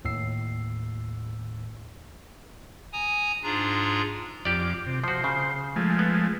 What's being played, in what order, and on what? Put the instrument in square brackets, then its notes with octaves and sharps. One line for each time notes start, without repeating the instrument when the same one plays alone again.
[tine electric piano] D#2 A2 E6 C7
[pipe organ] G#5 A#5 D#6
G#2 D4 F4 G#4 A#5
[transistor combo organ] F2 D6 [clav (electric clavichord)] G4 D5
[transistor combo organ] C3
[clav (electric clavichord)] F3 F#4 [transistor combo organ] C5
[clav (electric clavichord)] C#3
[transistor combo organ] F3 G#3 A3
[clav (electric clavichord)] B3